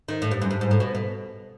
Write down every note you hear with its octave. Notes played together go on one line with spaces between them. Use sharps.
D#3
A2
G2
F#2
G2
G#2
A2
B2
B2